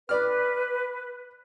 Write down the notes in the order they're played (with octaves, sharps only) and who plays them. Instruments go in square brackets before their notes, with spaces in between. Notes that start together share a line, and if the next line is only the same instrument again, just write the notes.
[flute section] B4 [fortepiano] D5 F6